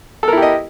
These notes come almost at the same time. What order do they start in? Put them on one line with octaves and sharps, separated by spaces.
A4 A#4 E4 G4 D#5